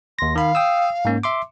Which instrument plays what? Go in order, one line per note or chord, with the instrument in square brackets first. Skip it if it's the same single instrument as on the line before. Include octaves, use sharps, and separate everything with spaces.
[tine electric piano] D#2 A#6 [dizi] C6
[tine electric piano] D#3 B5 [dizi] F5
[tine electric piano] G5 D#6 E6
G#2 A#3 C#4
E5 C6 D6